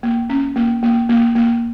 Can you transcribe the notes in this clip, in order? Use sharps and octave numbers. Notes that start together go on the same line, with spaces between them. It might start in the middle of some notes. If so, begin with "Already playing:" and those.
A#3
C#4
A#3
A#3
A#3
A#3